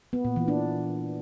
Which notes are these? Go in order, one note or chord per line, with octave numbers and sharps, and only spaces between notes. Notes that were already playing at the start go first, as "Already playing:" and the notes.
B3
A#2
E3
D4